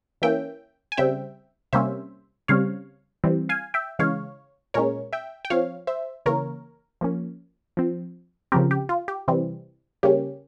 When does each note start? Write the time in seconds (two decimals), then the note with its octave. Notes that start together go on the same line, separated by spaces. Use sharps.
0.22 E3 A#3 C#4 E5 G5
0.92 G#5
0.97 C#3 G3 C4 E5 G5
1.73 C3 G3 A#3 C#4 C5 E5
2.48 C#3 G3 C4 C#5 F5
3.24 E3 G3 C4
3.49 F5 G#5
3.74 E5 G5
3.99 C#3 E3 G#3 C#5 F5
4.74 A#2 G#3 C#4 A#4 C#5
5.13 E5 G5
5.45 G5
5.50 F3 C4 C#5 F5
5.87 C5 E5
6.26 C#3 E3 A#3 A#4 C#5
7.01 F3 A#3 C#4
7.77 F3 C4
8.52 C#3 F3 C4 G4 A#4
8.71 G4
8.89 F4
9.08 G4
9.28 C3 E3 G3 C4
10.03 C#3 G3 A#3 C#4 G4